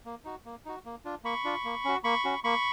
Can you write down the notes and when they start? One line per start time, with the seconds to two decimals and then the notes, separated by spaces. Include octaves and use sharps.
0.05 A#3
0.25 D#4 F#4
0.45 A#3
0.65 D#4 F#4
0.86 A#3
1.05 D4 F4
1.24 A#3 B5 C#6
1.44 D4 F4
1.65 A#3
1.85 C#4 F#4
2.04 A#3 B5 C#6
2.25 C#4 F#4
2.44 A#3 B5 C#6